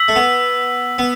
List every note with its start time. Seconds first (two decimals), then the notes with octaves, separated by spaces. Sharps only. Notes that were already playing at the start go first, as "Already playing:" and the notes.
Already playing: E6 B6 F#7
0.08 A3
0.15 B3
0.98 B3